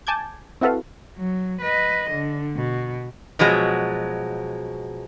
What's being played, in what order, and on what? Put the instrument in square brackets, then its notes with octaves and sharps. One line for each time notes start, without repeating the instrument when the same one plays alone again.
[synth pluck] G#5 A5 D6 G6 G#6
C4 E4 F#4 A4 B4 F5
[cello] F#3
B4 D#5
D3
B2
[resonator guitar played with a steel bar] B2 F3 F#3 G#3